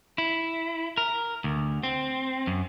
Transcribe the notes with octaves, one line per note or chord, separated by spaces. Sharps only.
E4
A#4
D2
C4
F#2